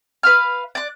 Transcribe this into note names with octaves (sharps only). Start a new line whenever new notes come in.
B4 F5 F6
D5 F#6